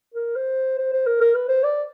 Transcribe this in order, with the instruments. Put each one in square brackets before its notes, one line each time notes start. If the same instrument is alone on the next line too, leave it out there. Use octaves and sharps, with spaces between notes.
[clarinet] A#4
C5
C5
C5
A#4
A#4
B4
C5
D5